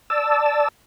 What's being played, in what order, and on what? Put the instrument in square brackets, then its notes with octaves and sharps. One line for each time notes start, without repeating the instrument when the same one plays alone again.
[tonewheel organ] D5 A5 E6